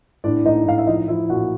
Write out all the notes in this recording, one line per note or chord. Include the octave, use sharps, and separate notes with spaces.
A2 D4 D5
A2 D#4 D#5
A2 F5
E5
F3 D#4 D#5
F3 E4 E5
A#2 F#4 F#5